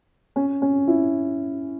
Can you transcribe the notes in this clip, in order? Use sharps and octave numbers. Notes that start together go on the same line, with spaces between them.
C#4
C#4
E4